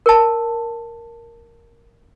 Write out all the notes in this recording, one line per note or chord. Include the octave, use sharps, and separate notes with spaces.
A#4 A5